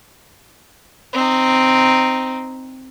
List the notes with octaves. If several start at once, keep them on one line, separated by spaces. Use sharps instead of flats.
C4 D#4